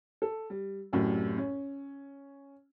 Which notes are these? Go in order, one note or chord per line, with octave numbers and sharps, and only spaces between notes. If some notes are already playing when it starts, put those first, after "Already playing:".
A4
G3
C2 F#2 A2 C3
C#4